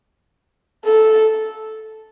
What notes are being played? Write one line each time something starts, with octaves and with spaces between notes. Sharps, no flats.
A4